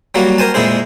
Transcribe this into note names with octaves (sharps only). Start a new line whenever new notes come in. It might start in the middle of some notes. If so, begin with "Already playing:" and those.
F#3 G3 A#3 F#4
A#4 C5 G#5 A5
F2 A#2 G#3 E4 G#4 C5